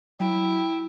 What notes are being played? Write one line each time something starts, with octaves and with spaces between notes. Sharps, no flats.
F#3 E4 G5